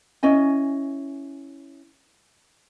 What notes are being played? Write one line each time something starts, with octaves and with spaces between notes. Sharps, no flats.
C#4 E4 D#5 G#5